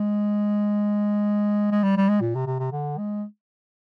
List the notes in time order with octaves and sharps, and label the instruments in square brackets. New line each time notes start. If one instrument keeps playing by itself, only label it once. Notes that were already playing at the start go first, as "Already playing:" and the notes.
Already playing: [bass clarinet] G#3
G#3
G3
G3
G#3
A#2
C3
C3
C3
D3
G#3